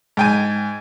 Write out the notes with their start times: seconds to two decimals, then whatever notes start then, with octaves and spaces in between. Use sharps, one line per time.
0.17 G#2 G5 G#5